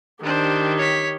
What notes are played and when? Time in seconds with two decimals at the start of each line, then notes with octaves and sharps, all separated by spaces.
0.23 D#3 D4 G4 C5
0.78 C#5 B6